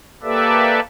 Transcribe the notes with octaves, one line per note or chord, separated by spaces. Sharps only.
A#3 G4 A4 B4 D5 E5